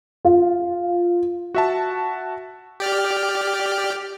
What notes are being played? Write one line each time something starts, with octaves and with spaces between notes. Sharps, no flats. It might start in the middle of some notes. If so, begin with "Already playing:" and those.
F4
F#4 E5 A5
G4 D5 F6